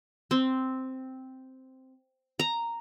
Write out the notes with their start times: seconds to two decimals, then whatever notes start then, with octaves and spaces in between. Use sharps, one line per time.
0.31 C4
2.39 A#5